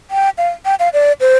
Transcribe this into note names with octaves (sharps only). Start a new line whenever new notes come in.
G5
F5
G5
F5
D5
C5